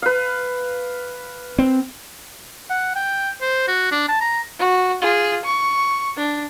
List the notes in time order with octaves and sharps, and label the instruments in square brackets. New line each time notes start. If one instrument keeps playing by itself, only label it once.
[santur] B4 F5
[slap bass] C4
[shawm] F#5
G5
C5
F#4
D4
A5
A#5
[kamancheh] F#4
F4 G#4
C#6
D4